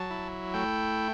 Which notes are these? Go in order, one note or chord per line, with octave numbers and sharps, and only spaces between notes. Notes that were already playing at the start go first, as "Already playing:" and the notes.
Already playing: F#3 A5
E4
A3 G5